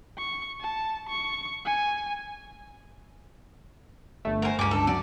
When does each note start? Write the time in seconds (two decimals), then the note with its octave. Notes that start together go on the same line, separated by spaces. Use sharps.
0.18 C#6
0.61 A5
1.09 C#6
1.66 G#5
4.25 G1 A3
4.42 A#4 C5 F#5 G#5
4.59 C#2 G2 C#4 G#5 A#5 D6
4.71 D3 A4
4.87 F#3 D5